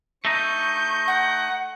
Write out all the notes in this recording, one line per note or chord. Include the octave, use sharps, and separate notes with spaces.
A3 D#4 C#6 G6
F#5